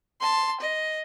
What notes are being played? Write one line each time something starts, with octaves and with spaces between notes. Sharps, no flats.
A5 C6
D#5